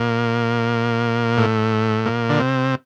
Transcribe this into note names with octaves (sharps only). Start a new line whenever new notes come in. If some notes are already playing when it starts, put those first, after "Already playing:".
Already playing: A#2
A2
A#2
D3
C3